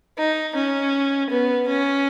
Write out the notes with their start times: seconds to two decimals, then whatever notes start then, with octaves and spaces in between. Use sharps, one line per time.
0.18 D#4
0.55 C#4
1.30 B3
1.68 C#4